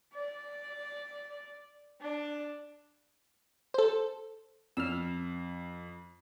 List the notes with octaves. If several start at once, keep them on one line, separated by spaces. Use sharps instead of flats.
D5
D4
A4 C5
F2 E6 F6